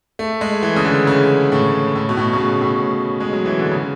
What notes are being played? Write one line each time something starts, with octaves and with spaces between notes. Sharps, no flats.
A3
G#3
E3
C#3
D3
C#3
A2
A2
B2
A2
C#3
B2
A2
G#3
F#3
E3
D3
C#3